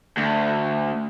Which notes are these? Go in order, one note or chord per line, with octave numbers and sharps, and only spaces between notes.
D2